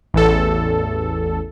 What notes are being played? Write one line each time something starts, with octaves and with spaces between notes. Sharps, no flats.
A1 E2 A4